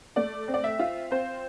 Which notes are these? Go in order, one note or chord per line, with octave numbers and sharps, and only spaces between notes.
A3 D5
C4
D5
E5
F4
C4 C5